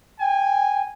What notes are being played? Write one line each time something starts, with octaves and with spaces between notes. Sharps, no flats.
G5 G#5